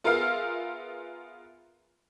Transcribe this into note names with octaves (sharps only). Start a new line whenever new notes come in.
B3 F4 G#4 A#4 E5 F5